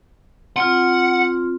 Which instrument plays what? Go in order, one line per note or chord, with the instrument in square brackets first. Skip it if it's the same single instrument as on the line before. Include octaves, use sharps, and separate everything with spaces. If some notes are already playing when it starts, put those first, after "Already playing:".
[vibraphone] C4 F4 [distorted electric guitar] F#5